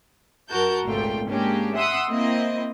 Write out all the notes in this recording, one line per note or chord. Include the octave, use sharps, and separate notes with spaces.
F#2 F#4 A#4 A5 G6
G#1 C#2 A#2 A3 F4 G5
G#3 A#3 C#4 D4 G4
E5 F#5 C6 D#6 E6 F#6
A#3 C4 E4 D#5